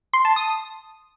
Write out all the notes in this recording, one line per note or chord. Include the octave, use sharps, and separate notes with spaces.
C6
A5
D#6